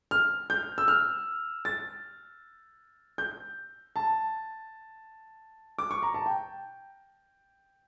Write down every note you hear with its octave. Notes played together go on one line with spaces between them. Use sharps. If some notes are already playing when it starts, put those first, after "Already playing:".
F6
G6
E6
F6
A6
G6
A5
D6
C#6
A#5
A5
G5